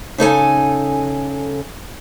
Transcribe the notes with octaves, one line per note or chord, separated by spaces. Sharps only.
C#3 D#4 A4 G#5